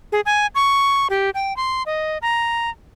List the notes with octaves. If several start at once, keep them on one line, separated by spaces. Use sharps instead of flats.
G#4
G#5
C#6
G4
G5
C6
D#5
A#5